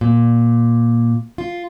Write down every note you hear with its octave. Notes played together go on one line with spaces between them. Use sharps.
A#2
F4